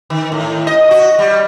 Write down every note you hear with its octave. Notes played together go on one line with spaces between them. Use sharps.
D#3
A2
D#5
F#4
G3